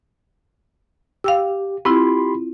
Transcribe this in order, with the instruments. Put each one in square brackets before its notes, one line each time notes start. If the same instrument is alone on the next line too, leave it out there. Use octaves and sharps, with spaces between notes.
[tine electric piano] G4 [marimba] F5 G5 E6
[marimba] C4 E4 F4 [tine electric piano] G4 B5 C6